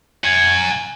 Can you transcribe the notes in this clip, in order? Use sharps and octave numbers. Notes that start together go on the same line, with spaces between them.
F#5 G#5